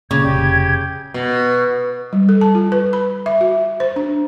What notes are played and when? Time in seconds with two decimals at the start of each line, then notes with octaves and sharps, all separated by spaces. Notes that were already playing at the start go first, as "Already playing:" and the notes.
0.11 A#2 C#3 D5 G#6
0.24 F1 G4
1.14 B2
2.13 G3
2.29 A4
2.41 A5
2.55 F4
2.72 B4
2.93 B5
3.26 E5
3.41 F#4
3.80 C5
3.96 D4